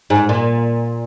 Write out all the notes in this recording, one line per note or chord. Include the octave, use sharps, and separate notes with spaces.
G#2
A#2